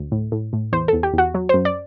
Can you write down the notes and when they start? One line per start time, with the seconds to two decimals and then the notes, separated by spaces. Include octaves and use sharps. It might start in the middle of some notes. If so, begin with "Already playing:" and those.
Already playing: D2
0.12 A2
0.32 A2
0.53 A2
0.72 E2 C5
0.88 A4
0.93 E2
1.03 G4
1.13 E2 F#4
1.34 F#3
1.49 C5
1.54 F#2
1.65 D5